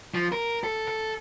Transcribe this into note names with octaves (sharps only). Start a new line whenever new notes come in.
F3
A#4
A4
A4